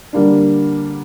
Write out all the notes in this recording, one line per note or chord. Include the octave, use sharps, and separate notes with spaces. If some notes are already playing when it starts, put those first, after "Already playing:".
D3 G3 A#3 D4